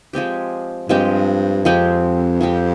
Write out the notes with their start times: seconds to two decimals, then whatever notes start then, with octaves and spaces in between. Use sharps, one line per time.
0.13 F3 G#3 C4 G4
0.89 G2 F3 G#3 C4 G4
1.65 F2 F3 G#3 C4 G4
2.41 F3 G#3 C4 G4